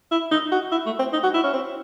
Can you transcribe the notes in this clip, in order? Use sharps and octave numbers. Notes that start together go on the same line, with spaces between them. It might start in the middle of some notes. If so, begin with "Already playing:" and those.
E4
D#4
F#4
E4
A3
C4
D#4
F#4
E4
C#4
C4